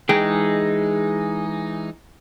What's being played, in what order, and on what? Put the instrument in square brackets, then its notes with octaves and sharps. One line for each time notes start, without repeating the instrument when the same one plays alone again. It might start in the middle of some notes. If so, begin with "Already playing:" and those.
[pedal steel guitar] E3 G#3 D#4 [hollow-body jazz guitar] G#4 G5